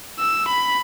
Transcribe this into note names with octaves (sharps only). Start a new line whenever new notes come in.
E6
B5